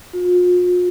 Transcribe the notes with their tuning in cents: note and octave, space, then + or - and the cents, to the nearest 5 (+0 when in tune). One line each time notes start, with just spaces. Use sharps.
F4 +40